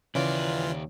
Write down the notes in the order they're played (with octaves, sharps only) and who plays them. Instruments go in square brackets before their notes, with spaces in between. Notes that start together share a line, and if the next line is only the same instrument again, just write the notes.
[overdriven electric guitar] D#2 D5 [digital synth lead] C#3 [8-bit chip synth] E3 F4